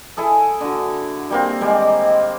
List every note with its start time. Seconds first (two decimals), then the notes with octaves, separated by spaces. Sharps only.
0.17 E4 G#4 A4
0.60 D3 F#4
1.30 G3 A#3 C4
1.61 D#3 G3 G#3